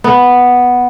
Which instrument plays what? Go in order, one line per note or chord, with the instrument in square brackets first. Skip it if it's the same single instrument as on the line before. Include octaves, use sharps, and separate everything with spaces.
[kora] B3